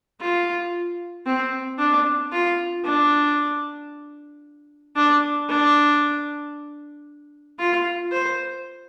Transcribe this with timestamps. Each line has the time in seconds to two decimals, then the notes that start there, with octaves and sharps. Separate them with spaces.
0.21 F4
1.26 C4
1.79 D4
2.32 F4
2.84 D4
4.96 D4
5.49 D4
7.59 F4
8.12 C5